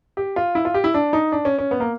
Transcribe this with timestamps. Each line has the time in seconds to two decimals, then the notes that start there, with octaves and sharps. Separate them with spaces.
0.17 G4
0.36 F4
0.55 E4
0.65 F4
0.74 G4
0.84 E4
0.94 D4
1.13 D#4
1.32 D4
1.45 C#4
1.59 C#4
1.71 B3
1.80 A#3